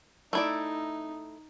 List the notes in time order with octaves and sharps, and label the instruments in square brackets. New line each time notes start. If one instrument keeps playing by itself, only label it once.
[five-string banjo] A3 E4 D5 [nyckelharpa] D#4